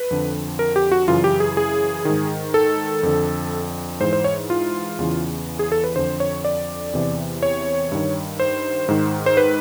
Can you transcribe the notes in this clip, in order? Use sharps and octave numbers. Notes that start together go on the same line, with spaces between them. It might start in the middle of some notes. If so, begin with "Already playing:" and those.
Already playing: B4
F2 D3
A#4
G4
F#4
F#2 C#3 E3 F4
G4
G#4
G#4
G#2 D#3
A4
F2 D3
G#2 E3 C5
C5
C#5
F4
E2 C#3 E3
G#4
A4
B4
F2 D3 C5
C#5
D5
E2 C3 E3
C#5
G2 D#3
C5
G#2 D#3
C5
B4